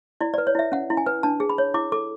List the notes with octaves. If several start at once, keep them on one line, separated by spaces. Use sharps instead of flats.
E4 D5
D5
B4
C#5
E4 E5
C#4 F#5
E4
G#5
B4
D4 A5
G#4
B5
C#5
E4 D6
A4 D6